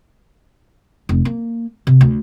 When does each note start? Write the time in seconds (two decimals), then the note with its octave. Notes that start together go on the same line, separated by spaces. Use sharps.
1.09 F1
1.25 A#3
1.87 C3
2.01 D2